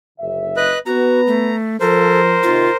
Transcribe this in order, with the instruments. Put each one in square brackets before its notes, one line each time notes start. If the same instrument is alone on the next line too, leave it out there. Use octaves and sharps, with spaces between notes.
[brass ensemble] F#1 D3 E5
[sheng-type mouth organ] B4 D#5 F#6
[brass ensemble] B3 B4 [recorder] F#4 [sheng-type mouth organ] A#5
[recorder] A3
[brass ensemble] F3 [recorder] A4 [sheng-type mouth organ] A#4 C5
[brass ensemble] C3 D#3 [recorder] F4